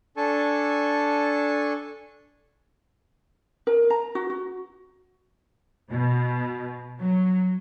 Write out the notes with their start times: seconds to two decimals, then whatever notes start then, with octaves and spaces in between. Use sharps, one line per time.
0.17 D4 A4 G#5 A5 C#6
3.67 A#4
3.90 A#5
4.15 F#4
4.30 F#4
5.90 B2
7.00 F#3